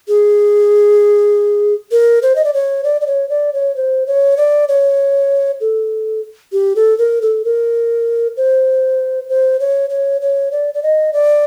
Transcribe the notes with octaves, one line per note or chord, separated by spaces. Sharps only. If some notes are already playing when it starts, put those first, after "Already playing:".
G#4
A#4
C5
D#5
D5
C#5
D5
D5
C#5
D5
C#5
C5
C#5
D5
C#5
A4
G4
A4
A#4
A4
A#4
C5
C5
C#5
C#5
C#5
D5
D5
D#5
D5